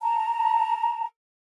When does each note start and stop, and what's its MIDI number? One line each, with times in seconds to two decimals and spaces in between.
0.01 1.06 81
0.01 1.06 82